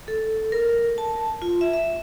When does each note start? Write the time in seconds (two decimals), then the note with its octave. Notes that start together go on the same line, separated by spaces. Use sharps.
0.08 A4
0.52 A#4
0.98 A5
1.42 F4
1.61 E5
1.73 E5